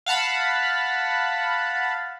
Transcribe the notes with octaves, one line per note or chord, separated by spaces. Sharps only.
F5 F#5 A5 B5